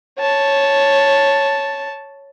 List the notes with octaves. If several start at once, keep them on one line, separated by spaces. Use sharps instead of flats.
C#5 A5